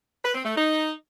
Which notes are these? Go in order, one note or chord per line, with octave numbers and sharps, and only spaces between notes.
B4
C4
A3
D#4